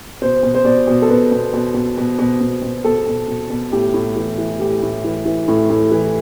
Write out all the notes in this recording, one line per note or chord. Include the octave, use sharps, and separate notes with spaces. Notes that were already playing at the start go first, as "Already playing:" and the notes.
B2 C5
B2
C5
B2 D5
B2
A4
B2 B4
B2
B2
B2
B2
B2
B2
B2
B2 A4
B2
B2
B2
A2 G4
A2
E3
E3
A2 G4
A2
E3
E3
A2
A2
E3